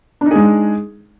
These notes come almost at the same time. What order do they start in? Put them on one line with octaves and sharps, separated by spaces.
D4 D#4 G#4 G#3